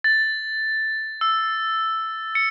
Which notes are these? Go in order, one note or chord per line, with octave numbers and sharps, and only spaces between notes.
A6
E6
C#7